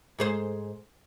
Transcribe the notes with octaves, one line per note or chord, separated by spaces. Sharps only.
G#2 G#4 C5